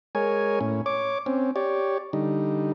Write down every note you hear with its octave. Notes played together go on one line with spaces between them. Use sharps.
G#3 A#4 C#5 G#5
A2 C#4
C#5 D6
C4 C#4
G4 C#5 D5
D3 G3 D#4